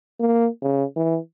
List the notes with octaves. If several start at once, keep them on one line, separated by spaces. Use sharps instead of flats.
A#3
C#3
E3